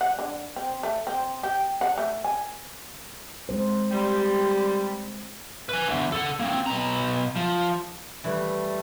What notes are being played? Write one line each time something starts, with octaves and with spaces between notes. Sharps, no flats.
F#5
D3
C4
A3
C4
G4
F#5
A3
G#5
G#3 C4 C5
G3 C6
B4 G#5
E2 D3
A4 F#5
A#3 C4
B2 A#5
F3
E3 G3 A3